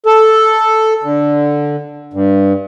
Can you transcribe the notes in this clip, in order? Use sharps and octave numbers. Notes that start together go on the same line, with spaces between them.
A4
D3
G2